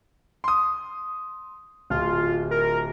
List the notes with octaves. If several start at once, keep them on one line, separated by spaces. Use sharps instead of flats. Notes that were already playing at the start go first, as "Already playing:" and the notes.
C6 D#6
D1 F4
A#4